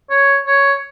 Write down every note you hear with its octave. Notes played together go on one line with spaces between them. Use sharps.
C#5
C#5